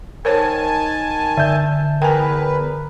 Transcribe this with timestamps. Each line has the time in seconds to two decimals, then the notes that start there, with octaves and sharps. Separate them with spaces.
0.25 D#3 A#4 C5 C#5 G#5 A5
1.37 D3 E5 G6
2.02 E2 A#4 B4 G5 G#5